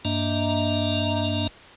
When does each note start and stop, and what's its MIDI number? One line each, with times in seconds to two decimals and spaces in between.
0.05 1.47 43
0.05 1.47 58
0.05 1.47 62
0.05 1.47 75
0.05 1.47 76
0.05 1.47 82